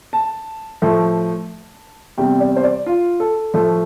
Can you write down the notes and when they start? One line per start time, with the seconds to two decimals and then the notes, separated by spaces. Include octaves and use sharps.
0.13 A5
0.82 A2 F3 A3
2.18 E2 C3 G3 G5
2.40 D5
2.56 C5
2.64 D5
2.86 F4
3.20 A4
3.54 A2 F3 A3